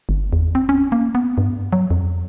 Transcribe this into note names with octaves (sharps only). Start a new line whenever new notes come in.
G1
E2
C4
C#4
A#3
B3
G2
F#3
F2